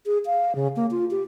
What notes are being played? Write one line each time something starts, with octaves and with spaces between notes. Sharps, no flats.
G#4
F5
C#3
A#3
F4
G4